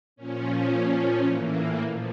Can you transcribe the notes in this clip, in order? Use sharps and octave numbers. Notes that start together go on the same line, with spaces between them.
A#2 F3 C#4
A#2 F3
A2 E3 A#3
A#2 F3